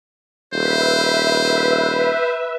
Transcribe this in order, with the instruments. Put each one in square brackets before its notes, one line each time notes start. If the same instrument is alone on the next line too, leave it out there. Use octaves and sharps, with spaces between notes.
[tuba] D#1 [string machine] B4 E5 [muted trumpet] C5